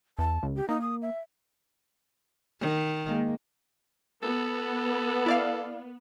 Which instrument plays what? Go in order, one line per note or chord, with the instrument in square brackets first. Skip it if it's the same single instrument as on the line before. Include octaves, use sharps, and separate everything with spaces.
[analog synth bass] E2 [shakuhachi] A5
[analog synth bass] C#2
[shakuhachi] G4
[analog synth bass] A#3 [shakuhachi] D#4
[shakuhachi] D#6
E5
[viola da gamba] D#3
[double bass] G#3 A#3
[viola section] B3 [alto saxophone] A4
[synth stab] E4 D5 F5